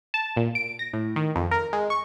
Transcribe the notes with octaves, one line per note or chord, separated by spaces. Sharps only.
A5
A#2
D7
A#6
A2
D#3
F2
A#4
G#3
C#6